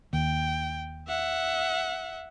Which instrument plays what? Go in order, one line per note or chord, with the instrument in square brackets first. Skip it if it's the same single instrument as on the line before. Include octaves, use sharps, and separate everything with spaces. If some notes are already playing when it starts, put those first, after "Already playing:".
[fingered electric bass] D#2 [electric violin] G5
[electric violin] E5 F#5